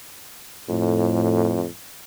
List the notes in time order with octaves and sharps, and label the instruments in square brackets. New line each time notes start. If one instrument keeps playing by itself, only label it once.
[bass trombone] F2 [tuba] A2